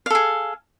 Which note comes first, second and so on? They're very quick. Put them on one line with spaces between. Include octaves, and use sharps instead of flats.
F5 A4 G#4